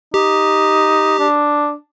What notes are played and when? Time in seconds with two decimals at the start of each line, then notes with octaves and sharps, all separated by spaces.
0.14 D#4 G4
1.19 D4